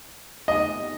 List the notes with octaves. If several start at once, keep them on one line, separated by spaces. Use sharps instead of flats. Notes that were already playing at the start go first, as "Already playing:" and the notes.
D#5